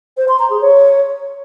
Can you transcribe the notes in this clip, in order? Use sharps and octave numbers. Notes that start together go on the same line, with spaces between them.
C5
C6
A#5
G#4
C#5